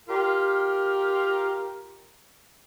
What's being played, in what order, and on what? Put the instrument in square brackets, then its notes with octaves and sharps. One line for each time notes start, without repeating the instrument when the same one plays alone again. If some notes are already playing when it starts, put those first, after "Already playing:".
[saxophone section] F4 G4 A#4